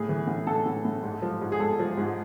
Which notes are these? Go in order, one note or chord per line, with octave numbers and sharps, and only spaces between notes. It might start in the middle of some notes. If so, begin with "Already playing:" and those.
Already playing: A2 G#4
E3
A2
A2 A4
A2
A2
G#2
F3
G#2
G#4
G#2 A4
F3
G#2